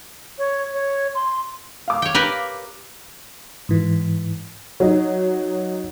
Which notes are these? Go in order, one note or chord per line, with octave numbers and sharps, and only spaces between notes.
C#5
C#5
C6
F5 D6
C#5 G5
G4 A#4 B4
G#2 E3
F#3 D#4